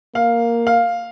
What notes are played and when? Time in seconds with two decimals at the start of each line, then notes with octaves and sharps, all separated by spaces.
0.15 A#3 F5
0.67 F5